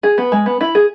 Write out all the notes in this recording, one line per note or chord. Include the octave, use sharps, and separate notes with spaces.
G#4
B3
G#3
B3
E4
G#4